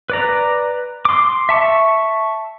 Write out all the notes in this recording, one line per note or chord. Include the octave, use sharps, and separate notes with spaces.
B4 D5 A#5
C6 D6
E5 A5 C#6